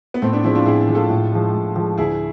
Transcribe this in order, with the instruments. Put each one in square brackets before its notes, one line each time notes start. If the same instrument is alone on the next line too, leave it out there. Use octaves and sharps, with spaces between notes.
[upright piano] B3
[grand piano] A2 [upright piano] A3 C4
[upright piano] B3 D4
[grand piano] F3 G#3 [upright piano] C4 E4
[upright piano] D4 F4
[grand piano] A2 [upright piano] E4 G#4
[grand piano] F3 G#3
[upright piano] F4 A4
[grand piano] A2
F3 G#3
A2
F3 G#3
[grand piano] D2 [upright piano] E4 G#4